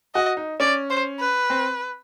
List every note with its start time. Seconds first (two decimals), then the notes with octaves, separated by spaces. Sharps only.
0.14 F#4 D#5
0.37 D#4
0.60 C#4 D5
0.90 C5
1.20 B4
1.50 C4